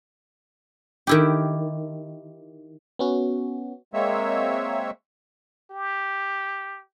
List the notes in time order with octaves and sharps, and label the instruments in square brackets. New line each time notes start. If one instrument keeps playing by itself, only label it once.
[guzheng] D#3 E4 G4
[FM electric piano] B3 C#4 F#4
[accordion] G#3 A#3 C4 C#5 E5
[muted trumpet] G4